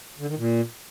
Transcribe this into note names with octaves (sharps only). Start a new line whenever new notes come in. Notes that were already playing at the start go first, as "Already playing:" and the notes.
D3
D#3
A#2